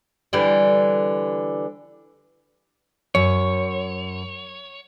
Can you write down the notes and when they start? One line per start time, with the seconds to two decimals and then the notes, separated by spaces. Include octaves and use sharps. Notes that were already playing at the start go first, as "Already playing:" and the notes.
0.33 D3 E3 G3
3.15 F#2 C#5